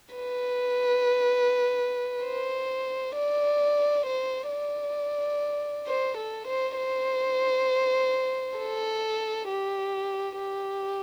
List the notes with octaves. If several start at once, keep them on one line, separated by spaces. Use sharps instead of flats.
B4
C5
D5
C5
D5
C5
A4
C5
C5
A4
G4
G4